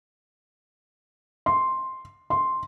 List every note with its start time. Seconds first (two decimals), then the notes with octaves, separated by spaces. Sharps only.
1.46 C6
2.30 C6